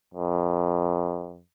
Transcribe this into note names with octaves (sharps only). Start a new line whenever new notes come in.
F2